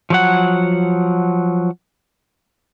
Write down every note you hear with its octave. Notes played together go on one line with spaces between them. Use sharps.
F3 F#3 F#5